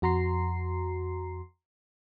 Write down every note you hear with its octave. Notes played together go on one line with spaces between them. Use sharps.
F2 F#4 A#5 C6 C7